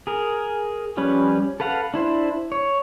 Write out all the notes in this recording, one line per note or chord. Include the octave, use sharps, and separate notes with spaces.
G#4 A#4
F3 G3 C#4 B4
A4 B4 F5 F#5
D4 E4 C5
C#5